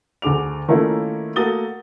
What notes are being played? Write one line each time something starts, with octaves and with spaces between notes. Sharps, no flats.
D2 D3 G#4 D6 F7
D#3 A3 A#3 C#4 E4 F4
A3 A#3 F#4 D#6 A6 G7